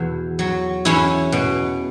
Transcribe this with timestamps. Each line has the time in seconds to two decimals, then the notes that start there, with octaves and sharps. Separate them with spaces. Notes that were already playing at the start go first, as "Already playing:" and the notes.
Already playing: E2 B2
0.39 F#3
0.85 E2 C#4 E4
1.32 B2